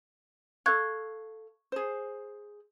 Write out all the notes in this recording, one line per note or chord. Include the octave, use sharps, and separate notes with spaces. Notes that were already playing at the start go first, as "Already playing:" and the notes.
A4 F5 C#6 F#6 G#6
G#4 C5